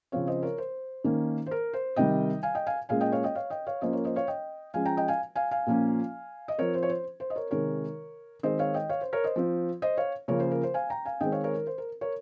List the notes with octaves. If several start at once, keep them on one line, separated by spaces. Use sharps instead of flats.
C#3 F3 C4 C#5 F5
C5 D#5
A#4 C#5
C5
D#3 A#3 C#4
C5
A#4
C5
C3 D#3 G3 D#5 G5
F5 G#5
D#5 G5
F5 G#5
A#2 G#3 C#4 F5 G#5
D#5 G5
C#5 F5
D#5 G5
C#5 F5
D#5 G5
C#5 F5
F3 A#3 C#4 C5 D#5
A#4 C#5
C5 D#5
C#5 F5
D#5 G5
F3 G#3 C#4 F5 G#5
G5 A#5
D#5 G5
F5 G#5
F5 G#5
F5 G#5
A#2 F3 A#3 C#4
D#5
F3 C4 A#4 C#5
C5
C#5
C5
C5
D#5
A#4 C#5
C3 D#3 G#3 A#4 C#5
D#3 G#3 C4 C5 D#5
C#5 F5
D#5 G5
C#5 F5
C5
A#4 C#5
C5 D#5
F3 C4
C5 D#5
C#5 F5
C#3 F3 A#3 C#4 A#4 C#5
C5
A#4
C5
F5 G#5
G5 A#5
F5 G#5
D#3 G#3 C4 D#5 G5
C#5 F5
A#4 C#5
A#4
C5
A#4
A#4 C#5